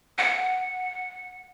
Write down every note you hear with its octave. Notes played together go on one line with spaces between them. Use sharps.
F#5